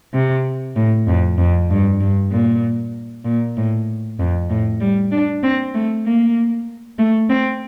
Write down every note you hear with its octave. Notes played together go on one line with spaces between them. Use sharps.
C3
A2
F2
F2
G2
G2
A#2
A#2
A2
F2
A2
G3
D4
C4
A3
A#3
A3
C4